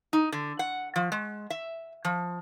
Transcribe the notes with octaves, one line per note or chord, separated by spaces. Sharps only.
D#4
D3
F#5
F3
G#3
E5
F3